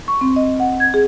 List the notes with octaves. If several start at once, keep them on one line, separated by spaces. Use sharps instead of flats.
C#6
C4
D#5
F#5
G#6
G#4